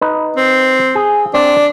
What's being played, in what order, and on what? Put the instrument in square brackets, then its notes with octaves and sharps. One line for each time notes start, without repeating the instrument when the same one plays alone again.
[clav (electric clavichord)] D#4 B4
[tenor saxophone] C4
[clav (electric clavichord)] G#4
[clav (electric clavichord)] C4 D5 [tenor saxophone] D4